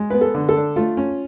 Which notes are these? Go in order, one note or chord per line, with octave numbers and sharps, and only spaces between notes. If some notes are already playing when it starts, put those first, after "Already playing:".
Already playing: G#3
B3 B4
A4
D3
A4
D4
A3 F4
C#4